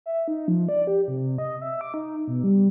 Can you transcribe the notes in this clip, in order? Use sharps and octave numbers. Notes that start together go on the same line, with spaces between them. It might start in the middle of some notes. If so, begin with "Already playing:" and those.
E5
D#4
F3
D5
G4
C3
D#5
E5
D6
D#4
B2
G3